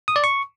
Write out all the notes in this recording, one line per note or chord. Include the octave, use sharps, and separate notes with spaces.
D#6
D5
C#6